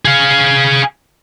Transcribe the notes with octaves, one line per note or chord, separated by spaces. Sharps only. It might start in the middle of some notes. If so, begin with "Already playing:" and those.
G#4 F5